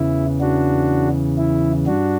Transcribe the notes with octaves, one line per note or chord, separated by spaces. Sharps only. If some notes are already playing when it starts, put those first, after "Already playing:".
Already playing: E2 C#3 E3 E4
D4 F#4
E4
G2 D4 F#4